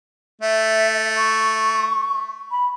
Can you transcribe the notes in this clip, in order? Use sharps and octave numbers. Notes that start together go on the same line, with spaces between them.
A3 E5
C#6
B5